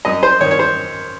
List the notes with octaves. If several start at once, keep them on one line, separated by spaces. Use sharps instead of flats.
F#2 D#5
C5
D#3 C#5
C#5
C5